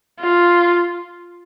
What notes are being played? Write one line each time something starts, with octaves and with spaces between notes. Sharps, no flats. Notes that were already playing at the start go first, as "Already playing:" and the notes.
F4